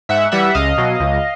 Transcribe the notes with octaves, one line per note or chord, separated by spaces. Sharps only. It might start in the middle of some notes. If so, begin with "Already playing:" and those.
G#2 E5 F#5
E3 G3 E5 F#5
C#2 D#5 F5
B2 F#3
C#2